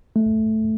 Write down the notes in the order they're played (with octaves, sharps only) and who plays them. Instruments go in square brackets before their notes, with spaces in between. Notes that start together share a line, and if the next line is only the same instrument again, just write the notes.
[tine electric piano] A3